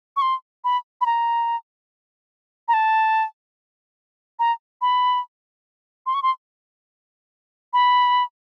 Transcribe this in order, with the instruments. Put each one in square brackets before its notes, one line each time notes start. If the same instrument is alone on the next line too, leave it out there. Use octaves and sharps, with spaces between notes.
[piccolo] C#6
C6
B5
B5
A#5
A#5
A5
A#5
B5
C6
C#6
C6
B5